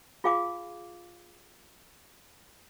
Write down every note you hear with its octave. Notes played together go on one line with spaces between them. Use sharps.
F4 G#4 F5 G#5 D6